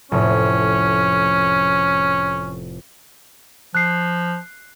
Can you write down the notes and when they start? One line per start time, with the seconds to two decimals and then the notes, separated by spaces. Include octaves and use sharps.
0.12 F1 A2 C#4
3.75 F3 F#6 C7